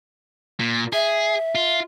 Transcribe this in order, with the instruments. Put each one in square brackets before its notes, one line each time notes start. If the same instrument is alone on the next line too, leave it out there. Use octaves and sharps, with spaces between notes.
[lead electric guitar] A#2
[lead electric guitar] G#4 [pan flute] E5
[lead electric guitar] F4